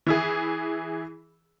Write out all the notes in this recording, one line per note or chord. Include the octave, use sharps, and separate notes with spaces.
E3 E4 G#4